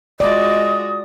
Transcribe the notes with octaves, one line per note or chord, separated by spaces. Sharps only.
G#3 F4 F#4 D5 D#5 D#6